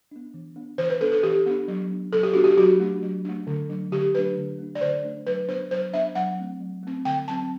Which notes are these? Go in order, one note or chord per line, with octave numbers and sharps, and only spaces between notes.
B3 D4
E3
B3 D4
E3 C5
B4
B3 D4 A4
A4
E3 G4
B3 D4
F#3
B3 D4
F#3 A4
G4
B3 D4 F#4
G4
F#3 F#4
A3 D4
F#3
A3 D4
D3
F#3 A3 D4
D3 G4
F#3 A3 D4 B4
D3
A3 D4
D5
D3 C5
A3 D4
F#3 B4
B3 D4 C5
F#3 C5
B3 D4 E5
F#3 F#5
A3 C4
F#3
A3 C4
D3 G5
F#3 C4 A5